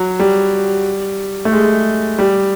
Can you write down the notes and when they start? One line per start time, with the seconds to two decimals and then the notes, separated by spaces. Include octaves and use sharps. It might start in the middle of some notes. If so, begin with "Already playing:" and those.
Already playing: F#3
0.20 G3
1.45 A3
1.52 G#3
2.19 G3